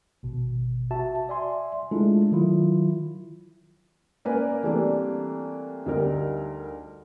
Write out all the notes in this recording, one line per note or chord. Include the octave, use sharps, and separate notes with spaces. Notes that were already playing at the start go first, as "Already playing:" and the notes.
G#1 B2
F#4 E5 A5
D5 E5 G#5 C6
G#3 A3 D4 E4 F4 A4
D#3 F#3 E4 F4
A#3 C#4 A#4 B4 D5 G#5
E3 G3 A3 A#3 C4 D4
D2 G3 D#4 A#4